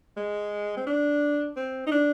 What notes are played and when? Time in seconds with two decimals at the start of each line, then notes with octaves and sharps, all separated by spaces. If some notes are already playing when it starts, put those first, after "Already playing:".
0.16 G#3
0.76 C4
0.87 D4
1.56 C4
1.86 D#4
1.91 D4